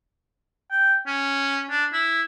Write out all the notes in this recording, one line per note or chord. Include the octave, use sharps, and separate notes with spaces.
G5
C#4
D4
E4